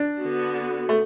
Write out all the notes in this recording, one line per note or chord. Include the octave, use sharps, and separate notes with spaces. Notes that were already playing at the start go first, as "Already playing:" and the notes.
Already playing: D4
D3 B3 F#4
A3